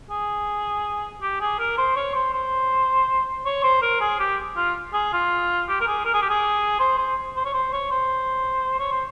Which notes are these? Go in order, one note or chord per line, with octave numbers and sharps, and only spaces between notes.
G#4
G4
G#4
A#4
C5
C#5
C5
C5
C#5
C5
A#4
G#4
G4
F4
G#4
F4
G4
A#4
G#4
A#4
G#4
G4
G#4
C5
C5
C5
C#5
C5
C#5
C5
C#5
C5